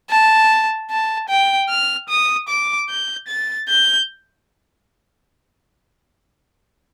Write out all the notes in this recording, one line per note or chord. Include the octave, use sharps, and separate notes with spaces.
A5
A5
G5
F6
D#6
D6
G6
A6
G6